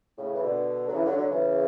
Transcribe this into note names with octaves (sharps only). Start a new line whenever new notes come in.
A2 C#3
E3
B2 D3
F#3
C#3 E3
D3 F#3
D3 F#3
C#3 E3